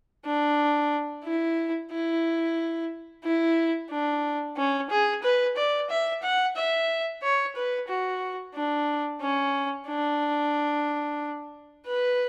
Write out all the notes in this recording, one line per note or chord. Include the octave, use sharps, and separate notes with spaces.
D4
E4
E4
E4
D4
C#4
G#4
B4
D5
E5
F#5
E5
C#5
B4
F#4
D4
C#4
D4
B4